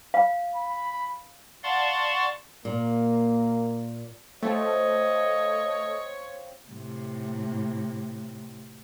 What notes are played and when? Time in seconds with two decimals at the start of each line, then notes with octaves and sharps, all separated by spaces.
0.14 F5
0.55 B5
1.63 D5 F5 F#5 A5 C6 C#6
2.65 A#2 A#3
4.43 A3 C4 F4 C#5 D#5 A5
6.69 A2 C3